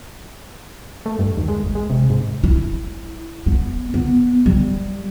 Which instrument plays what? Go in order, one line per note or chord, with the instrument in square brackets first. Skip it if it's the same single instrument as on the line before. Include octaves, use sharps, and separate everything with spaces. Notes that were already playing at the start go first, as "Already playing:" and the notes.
[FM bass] A3
G2
D#2
G#3
G1
G#3
C3
G#2
[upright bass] E4
B3
B3
G3